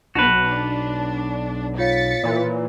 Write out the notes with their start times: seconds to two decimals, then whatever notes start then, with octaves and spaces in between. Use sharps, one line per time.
0.15 B1 F#4 B4 A5 F7
0.45 D4
1.78 F4 C#5 F5 A6 B6 C#7
2.24 A#2 E3